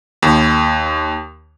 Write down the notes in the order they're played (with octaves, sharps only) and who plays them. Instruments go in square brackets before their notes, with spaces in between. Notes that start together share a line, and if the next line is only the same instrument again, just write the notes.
[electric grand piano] D#2